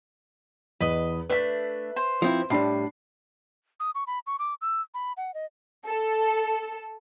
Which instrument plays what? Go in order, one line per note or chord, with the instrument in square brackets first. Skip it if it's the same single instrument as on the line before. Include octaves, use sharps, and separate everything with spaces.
[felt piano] E2 [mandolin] B4 D#5
[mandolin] A3 D4 [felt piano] B4 B6
[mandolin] C5
[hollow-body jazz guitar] F3 C4 E4
[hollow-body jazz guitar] A2 G3 [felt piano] D4 B5 C7
[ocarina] D#6
C#6
B5
C#6
D6
E6
B5
F#5
D#5
[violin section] A4